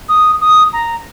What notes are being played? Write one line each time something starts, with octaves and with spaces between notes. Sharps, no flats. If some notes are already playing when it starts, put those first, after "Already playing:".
D#6
D#6
A#5